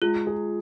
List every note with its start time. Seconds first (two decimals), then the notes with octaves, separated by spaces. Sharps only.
0.02 G#3 F4
0.27 G#4